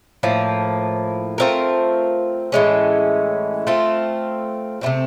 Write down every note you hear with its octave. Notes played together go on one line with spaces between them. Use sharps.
A2 F3 A#3
A3 C4 F4 A#4
A2 E3 G#3 C#4
A3 C4 F4
C3 E3 A3 C4